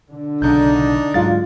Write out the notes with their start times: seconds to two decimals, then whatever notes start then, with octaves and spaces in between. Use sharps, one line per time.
0.12 D3
0.42 B1 C#3 D4 D#4 G6
1.14 G#2 F#3 G#3 F4 F5 A6